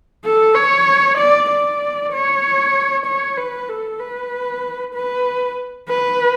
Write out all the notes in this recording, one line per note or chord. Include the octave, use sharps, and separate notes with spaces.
A4
C#5
D5
D5
C#5
C#5
B4
A4
B4
B4
B4